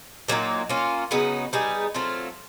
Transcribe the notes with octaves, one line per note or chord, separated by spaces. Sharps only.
A#2 F#3 A#3 D#4
A#3 C#4 F4
C#3 F#3 B3 D#4
G3 B3 D#4 G#4
F#3 A3 C4 F4